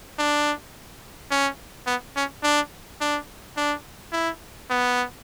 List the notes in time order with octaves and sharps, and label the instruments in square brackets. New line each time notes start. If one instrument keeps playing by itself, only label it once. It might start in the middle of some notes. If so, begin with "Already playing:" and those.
[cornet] D4
C#4
B3
C#4
D4
D4
D4
E4
B3